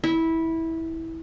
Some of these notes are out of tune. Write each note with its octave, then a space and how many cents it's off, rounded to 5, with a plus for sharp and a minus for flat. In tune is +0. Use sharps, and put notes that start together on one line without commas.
E4 -15